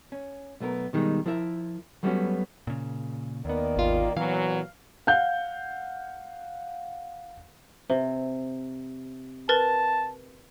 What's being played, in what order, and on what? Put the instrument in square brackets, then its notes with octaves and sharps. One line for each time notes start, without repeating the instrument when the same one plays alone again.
[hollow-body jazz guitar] C#4
B1 A3 B3 A#4
B2 D#3 G3 G#3
F3 E4 A#4 E5
F#3 G3 A3 B3 C#4 F#4
[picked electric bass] A#2 C#3
[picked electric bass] D#2 B3 [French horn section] D#3 A#3 D5
[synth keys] G#1 F4
[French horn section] A#2 F#3 B3 [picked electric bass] E3 [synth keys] F5
[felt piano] F5 F#5 G6
[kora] C3
[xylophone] A#4 B4 A6 [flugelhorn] A5